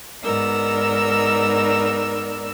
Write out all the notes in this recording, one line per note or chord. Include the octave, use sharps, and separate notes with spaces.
G#2 B3 D#4 A#4 D5 E6